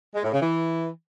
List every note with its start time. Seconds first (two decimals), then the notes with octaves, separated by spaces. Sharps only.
0.15 G#3
0.24 A2
0.33 C#3
0.42 E3